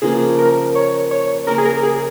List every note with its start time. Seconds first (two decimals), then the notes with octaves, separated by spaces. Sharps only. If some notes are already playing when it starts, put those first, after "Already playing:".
0.02 C#3 F3 A#3 C#4 G#4
0.39 A#4
0.75 C#5
1.11 C#5
1.47 C#3 A#3 C#4 A#4
1.58 G#4
1.65 A#4
1.83 G#4